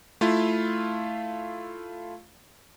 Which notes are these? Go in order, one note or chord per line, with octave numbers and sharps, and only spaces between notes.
A3 E4 F4 F5